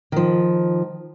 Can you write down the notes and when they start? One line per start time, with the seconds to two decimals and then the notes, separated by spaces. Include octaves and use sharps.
0.12 D#3 F3